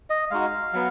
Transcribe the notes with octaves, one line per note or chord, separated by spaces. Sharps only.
D#5
G#3 D#4 F#4 F5
F#3 B3